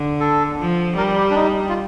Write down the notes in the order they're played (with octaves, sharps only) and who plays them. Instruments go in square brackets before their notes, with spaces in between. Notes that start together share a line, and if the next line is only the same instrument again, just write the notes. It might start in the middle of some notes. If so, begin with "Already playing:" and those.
Already playing: [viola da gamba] D3
[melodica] A4
[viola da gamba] F3
[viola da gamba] G3 [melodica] A#4
[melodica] G4
D4
D#4
F4